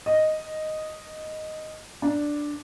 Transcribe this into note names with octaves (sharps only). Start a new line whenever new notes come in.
D#5
D4